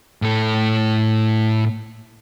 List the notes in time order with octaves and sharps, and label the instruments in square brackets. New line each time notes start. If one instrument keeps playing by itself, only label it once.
[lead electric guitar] A2 A4